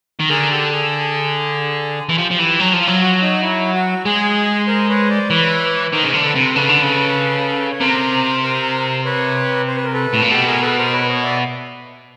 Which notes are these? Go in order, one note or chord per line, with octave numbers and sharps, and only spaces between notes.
D#3
D3 G#4 A#4
G4 A4
G#4
E3
F3 G4
F3
E3
F#3
F3
F4
F#3
F#4
D#4
E4
F#4
G#3 G#4
A#4 C5
B4 C#5
C5 D5
E3 B4 C#5
D#3 A#4 C5
C#3
D3
A4 B4
C3
C#3 A4 B4
D3
C#3
C#5
C3 A#4 C5
A#4 C5
B4 C#5
C5
B4
A#4
A4 B4
A2
A#2
B2 G4 A4
G#4 A#4
A4 B4
A#4 C5
B4 C#5
C#5 D#5
D5 E5